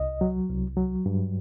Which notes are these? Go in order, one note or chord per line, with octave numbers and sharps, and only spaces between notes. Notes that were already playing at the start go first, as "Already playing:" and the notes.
Already playing: C2 D#5
F#3
C2
F#3
G2